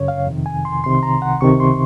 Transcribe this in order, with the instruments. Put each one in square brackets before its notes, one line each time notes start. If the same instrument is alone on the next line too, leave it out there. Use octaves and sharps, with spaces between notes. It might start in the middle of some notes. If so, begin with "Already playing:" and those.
Already playing: [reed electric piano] F#2 C#3 C#5
F5
F2 C3 D#3
G#5
C6
C2 C3 D#3 C6
A#5
F#5
C#2 C3 D#3 C#6
C6